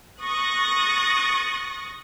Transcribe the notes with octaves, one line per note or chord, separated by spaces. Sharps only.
C#6 D#6 F#6 A6 A#6